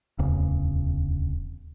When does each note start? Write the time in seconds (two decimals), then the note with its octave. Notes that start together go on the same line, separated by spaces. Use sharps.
0.19 D1 E2 C#3